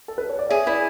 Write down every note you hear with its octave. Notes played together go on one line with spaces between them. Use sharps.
A4
B4
C#5
D5
G#4 C#5 E5
E4 B4 D5